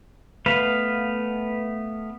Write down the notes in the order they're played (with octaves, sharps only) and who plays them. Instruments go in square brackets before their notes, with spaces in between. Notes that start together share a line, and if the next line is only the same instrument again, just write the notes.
[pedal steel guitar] A3 B3 B4 F5